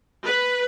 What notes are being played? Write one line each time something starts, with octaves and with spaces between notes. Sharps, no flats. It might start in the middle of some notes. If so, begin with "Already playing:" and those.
B4